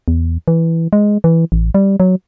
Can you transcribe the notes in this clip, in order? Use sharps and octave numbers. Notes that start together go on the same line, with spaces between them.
E2
E3
G#3
E3
A1
G3
F#3